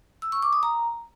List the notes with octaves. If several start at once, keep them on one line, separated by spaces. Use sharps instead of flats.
E6
C#6
D6
D#6
A#5